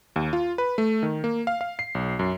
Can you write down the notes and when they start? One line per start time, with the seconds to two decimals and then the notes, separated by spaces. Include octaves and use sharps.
0.16 D#2
0.33 F4
0.58 B4
0.78 A3
1.03 D#3
1.24 A#3
1.47 F5
1.61 F5
1.79 C7
1.95 B1
2.19 F#2